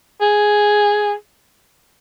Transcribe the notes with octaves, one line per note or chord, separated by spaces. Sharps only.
G#4